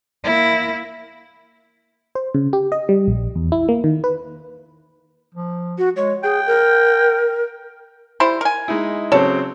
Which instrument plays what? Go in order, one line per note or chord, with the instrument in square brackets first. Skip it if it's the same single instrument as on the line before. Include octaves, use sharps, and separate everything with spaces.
[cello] A#3 E4
[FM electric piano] C5
C#3
G4
D#5
G3
A#1
E2
E4
A#3
D#3
B4
[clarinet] F3
[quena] F#4
[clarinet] G#3 [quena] C#5
[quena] G#4 [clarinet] G5
[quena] A#4
[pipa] G3 E4 C5
A#4 G#5
[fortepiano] G#3 D#4 E4
[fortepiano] C#3 F#3 C4 [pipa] A4 [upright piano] C#5